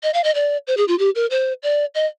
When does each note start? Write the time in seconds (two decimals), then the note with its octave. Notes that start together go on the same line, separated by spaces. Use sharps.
0.03 D#5
0.14 F5
0.24 D#5
0.35 D5
0.67 C5
0.77 G#4
0.88 F4
0.99 G4
1.15 A#4
1.31 C5
1.63 D5
1.95 D#5